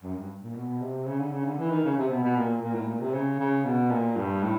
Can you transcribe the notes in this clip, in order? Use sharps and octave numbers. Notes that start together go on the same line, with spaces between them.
F#2
G2
A#2
B2
C3
C#3
D3
C#3
D3
E3
D#3
C#3
C3
B2
B2
A#2
A#2
A2
A#2
C3
C#3
C#3
B2
A#2
G2
A2